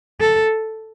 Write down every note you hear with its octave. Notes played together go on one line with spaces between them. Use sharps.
A4